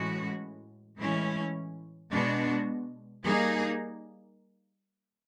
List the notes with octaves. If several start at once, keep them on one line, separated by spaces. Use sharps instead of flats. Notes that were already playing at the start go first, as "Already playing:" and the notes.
Already playing: A2 E3 G#3 C#4 F#4
A2 E3 G#3 C#4 E4
B2 G#3 B3 D4 F#4
G3 A#3 D#4 G#4